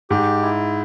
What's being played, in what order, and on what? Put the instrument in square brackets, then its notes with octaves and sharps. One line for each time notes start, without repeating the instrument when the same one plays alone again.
[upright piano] G#2 [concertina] G4
[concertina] E4